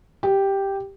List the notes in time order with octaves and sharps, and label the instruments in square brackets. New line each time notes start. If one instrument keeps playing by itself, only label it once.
[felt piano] G4